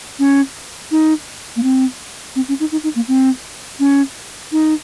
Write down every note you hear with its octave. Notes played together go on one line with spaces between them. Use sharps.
C#4
D#4
A#3
C4
C4
C#4
D#4
D#4
D#4
A#3
C4
C#4
D#4